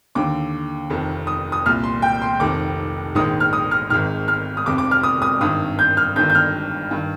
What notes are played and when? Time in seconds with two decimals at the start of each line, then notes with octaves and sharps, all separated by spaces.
0.15 D#2 D3 D6
0.90 F1 F2 D#3
1.27 D#6
1.52 D#6
1.66 C2 A#2 F6
1.84 C6
2.02 G5
2.22 C6
2.40 F1 F2 D#3 D6
3.15 A#1 G#2 D#3 D#6
3.40 F6
3.53 D#6
3.71 F6
3.90 G#1 G#2 D#3 F6
4.28 F6
4.57 D#6
4.66 F1 F2 C3 D6
4.78 D6
4.91 F6
5.03 D#6
5.22 D#6
5.41 G#1 G2 D#3 D#6
5.79 G6
5.97 F6
6.16 G1 G2 D#3 G6
6.30 G6
6.35 F6
6.91 G2 D#3